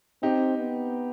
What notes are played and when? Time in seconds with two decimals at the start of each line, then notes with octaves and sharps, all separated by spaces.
0.22 C4 D#4 G4
0.59 B3